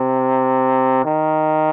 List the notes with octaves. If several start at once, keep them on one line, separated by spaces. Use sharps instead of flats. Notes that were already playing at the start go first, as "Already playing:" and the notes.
Already playing: C3
D#3